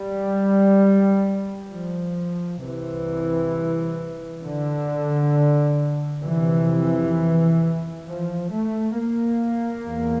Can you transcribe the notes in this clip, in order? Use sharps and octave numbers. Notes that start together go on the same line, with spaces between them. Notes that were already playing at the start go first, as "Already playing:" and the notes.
Already playing: G3
F3
C2 C3 E3
D3
F2 C3 E3
F3
A3
A#3
E2